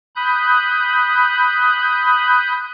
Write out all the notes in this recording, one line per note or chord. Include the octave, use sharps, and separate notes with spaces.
B5 D#6 F#6 G6